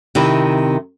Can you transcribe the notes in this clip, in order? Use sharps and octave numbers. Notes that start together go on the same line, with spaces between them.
C3 D#3 E4